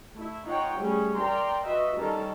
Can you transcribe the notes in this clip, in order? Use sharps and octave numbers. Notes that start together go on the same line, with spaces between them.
A3 E4
D#4 F4 C#5 F#5 G5
G3 A3 C#4 G#4
A#4 D5 G5 A#5 C6
F#4 B4 D#5 E5
D#3 G3 C#4 D#4 A4 A#4